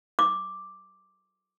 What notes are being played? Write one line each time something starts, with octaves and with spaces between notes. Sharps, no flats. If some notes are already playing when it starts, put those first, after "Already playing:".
D6